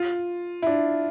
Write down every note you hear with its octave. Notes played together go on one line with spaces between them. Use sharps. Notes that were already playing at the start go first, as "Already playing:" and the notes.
Already playing: F4
E4
D4